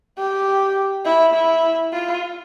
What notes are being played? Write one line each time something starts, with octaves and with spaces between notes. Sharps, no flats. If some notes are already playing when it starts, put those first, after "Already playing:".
G4
E4
E4
F4